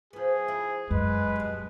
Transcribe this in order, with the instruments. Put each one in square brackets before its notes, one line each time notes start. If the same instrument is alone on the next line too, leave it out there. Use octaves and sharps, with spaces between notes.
[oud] F3 B3 [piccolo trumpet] G#4
[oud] E4
[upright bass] F#2 [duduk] G#3 [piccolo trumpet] B4
[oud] G2 B2